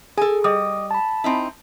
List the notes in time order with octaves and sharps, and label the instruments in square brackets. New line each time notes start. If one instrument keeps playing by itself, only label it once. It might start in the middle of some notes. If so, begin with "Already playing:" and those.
[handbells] G#4 [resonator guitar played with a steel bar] A4 G#5
[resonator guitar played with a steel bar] G3 [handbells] D#5 D6 D#6
[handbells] A5 B5
[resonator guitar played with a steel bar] C4 D#4 E4